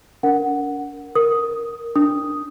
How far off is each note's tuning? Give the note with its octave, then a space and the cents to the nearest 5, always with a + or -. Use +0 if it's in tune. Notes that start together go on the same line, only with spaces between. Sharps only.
D4 -45 A#4 +0 F#5 +0
A#4 +0 D#6 +5
D4 +0 D#6 +0